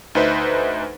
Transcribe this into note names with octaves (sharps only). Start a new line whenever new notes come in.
D2 D#4 B4 C5 E5 B6